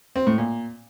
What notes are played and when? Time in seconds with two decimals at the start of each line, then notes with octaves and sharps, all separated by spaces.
0.16 C4
0.27 A2
0.38 A#2